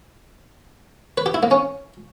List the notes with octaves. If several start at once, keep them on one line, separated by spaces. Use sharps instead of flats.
B4
G4
E4
A#3
C#4